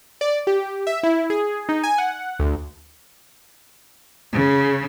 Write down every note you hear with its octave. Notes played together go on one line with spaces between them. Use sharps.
D5
G4
E5
E4
G#4
D#4
G#5
F#5
D2
C#3